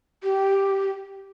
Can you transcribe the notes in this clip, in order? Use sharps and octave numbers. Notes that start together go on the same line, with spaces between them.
G4